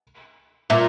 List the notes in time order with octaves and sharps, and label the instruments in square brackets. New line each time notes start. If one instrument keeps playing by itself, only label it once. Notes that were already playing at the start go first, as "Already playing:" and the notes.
[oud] A#2 [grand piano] E5